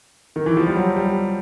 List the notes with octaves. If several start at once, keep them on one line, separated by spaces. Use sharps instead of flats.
D#3
E3
F3
G3
F#3
G3